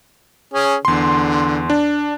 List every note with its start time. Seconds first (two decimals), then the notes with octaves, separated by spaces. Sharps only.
0.54 C#4 G#4
0.85 E2 D3 C6
1.70 D4